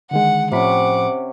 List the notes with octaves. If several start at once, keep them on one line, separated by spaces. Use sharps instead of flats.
D3 D#3 G#3 F#5
A2 C3 F3 C#4 F#5 B5 D6